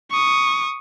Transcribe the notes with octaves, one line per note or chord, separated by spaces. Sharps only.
C#6 D#6